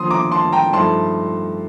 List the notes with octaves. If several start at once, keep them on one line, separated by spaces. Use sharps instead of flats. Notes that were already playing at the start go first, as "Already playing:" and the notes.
Already playing: D#2 D3 F3 C6 D#6
A#5 D6
A5 C6
G5 A#5
G2 F3 A3 D#4 A5 C6